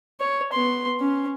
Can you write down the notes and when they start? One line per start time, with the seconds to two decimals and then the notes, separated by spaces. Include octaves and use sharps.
0.20 C#5
0.52 B3 C6
1.00 C#4